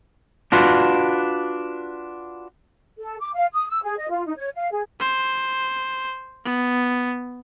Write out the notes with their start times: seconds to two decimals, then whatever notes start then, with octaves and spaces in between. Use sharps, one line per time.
0.52 D4 F4 F#4 B4
2.99 A4
3.19 D6
3.35 F5
3.53 D#6
3.69 E6
3.83 G#4
3.98 D#5
4.10 F4
4.25 D#4
4.37 C#5
4.55 F5
4.71 G#4
5.00 C5
6.45 B3